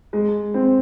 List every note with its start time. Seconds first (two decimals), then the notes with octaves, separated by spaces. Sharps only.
0.13 G#3
0.54 C4